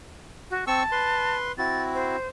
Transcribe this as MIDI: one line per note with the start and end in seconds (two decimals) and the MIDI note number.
0.50 0.65 66
0.67 0.83 60
0.67 1.36 81
0.67 0.83 85
0.67 0.83 88
0.92 1.52 71
0.92 1.52 84
1.58 2.17 60
1.58 2.17 64
1.58 2.17 66
1.58 1.82 93
1.94 2.27 72